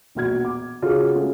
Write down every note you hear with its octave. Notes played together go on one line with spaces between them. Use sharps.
E1 A#1 F#4 F6 G#6
D6
C#3 C#4 F4 F#4 G#4 A4
G#3 A3 C#4 F4 F#4